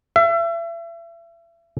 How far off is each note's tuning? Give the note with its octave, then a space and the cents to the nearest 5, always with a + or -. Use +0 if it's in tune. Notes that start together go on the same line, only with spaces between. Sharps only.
E5 +35